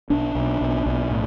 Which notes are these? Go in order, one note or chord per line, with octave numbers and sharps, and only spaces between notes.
B1 D4
B1
B1
B1
A2